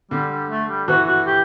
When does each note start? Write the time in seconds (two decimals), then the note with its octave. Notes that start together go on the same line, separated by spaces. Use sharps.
0.11 D3 G3
0.31 G3
0.50 A3
0.69 G3
0.88 E3 F#4
1.07 F#4
1.26 G4